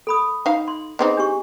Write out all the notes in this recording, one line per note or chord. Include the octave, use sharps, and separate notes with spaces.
A4 B5 D#6
D#4 F5
C6
B3 C4 D#4 E4 G#4 D#5
D4 G4 C#6